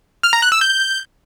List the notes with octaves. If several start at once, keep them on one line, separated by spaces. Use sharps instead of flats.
F6
A#5
F#6
E6
G6